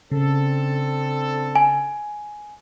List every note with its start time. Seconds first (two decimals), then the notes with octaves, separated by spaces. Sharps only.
0.11 C#3 C4 D4 A4
1.56 G#5